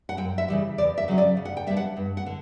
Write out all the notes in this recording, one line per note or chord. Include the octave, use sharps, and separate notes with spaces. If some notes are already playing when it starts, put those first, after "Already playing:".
F#5
F#2 G5
E5
C#3 E3 G3
E2 D5
E5
C#3 F#3 C#4
D5
C#3
F#5
G5
G3 B3 D4 E5
F#5
G2
F#5
D3